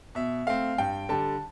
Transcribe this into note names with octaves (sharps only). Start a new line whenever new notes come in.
B2 E5
A3 C4 F5
G2 G5
D3 G3 A5